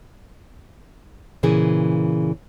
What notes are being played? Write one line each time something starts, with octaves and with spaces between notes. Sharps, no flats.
A#2 C#3 E3 G#4